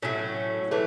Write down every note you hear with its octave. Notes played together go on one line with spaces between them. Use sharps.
A2 F#3 A3 C#4
E3 A3